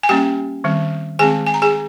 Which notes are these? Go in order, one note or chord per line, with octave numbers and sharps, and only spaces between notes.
G#5
G3 A#3 C#4 G4 G5
D#3 G3 C4
D#3 G#3 C4 G#4 G#5
G#5
A#5
G#4 G#5